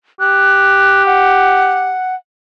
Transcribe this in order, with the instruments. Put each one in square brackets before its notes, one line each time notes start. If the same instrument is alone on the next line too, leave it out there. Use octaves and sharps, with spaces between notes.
[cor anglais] G4 [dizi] F#6
[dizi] F#5